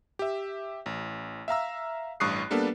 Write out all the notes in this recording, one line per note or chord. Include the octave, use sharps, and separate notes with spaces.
G4 E5
A1
E5 F5 A#5 E6
A1 G2 C#6 D#6 F#6 C7
G3 A#3 B3 D4 A4 B4